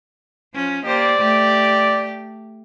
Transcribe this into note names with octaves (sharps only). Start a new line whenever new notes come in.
F3 C#4
A#3 G4 C5 D5
A3 G4